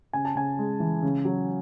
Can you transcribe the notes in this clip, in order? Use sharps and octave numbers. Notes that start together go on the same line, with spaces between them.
C#3 G#5
A5
C#3 G#5
G#3
E3
C#3
F#3